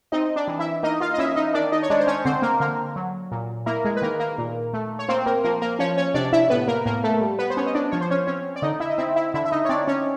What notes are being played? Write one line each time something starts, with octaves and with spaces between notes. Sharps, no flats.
C4 D#4 D#5
D4 D5
E3
E4 E5
A#3 D#4 D#5
F4 F5
D#5
C#4 E4 E5
D#4 D#5
D#3 D4 D5
D#4 D#5
C#5
G#3 D4 D5
C5
C#4 C#5
D3 C4 C5
A#3 A#4
D3 A#3 A#4
F#3
A#2
A#3 E4 A#4
G#3 G#4
B4
D#3 A#3 A#4
A#3 A#4
A#2
A3
C#5
A#3 C4 C5
A#3 A#4
F3 A#3 A#4
A#3 A#4
F3 C#4 C#5
C#4 C#5
C3 D4 D5
E4 E5
A2 B3 B4
A#3 A#4
A2 A#3 A#4
A3 A4
G3
B3 B4
C5
B3 C#4 C#5
D#5
D4 D5
F3 C#5
C5
C#4 C#5
C4 C#4 C#5
D5
D3 D#4 D#5
E4 E5
D#5
C4 E4 E5
E4 E5
D3 E4 E5
E5
D#4 D#5
C#5
C4 D4 D5
C#4 C#5